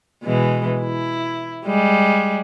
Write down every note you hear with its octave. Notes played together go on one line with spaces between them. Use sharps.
B2 E3 G#3
E4
G3 G#3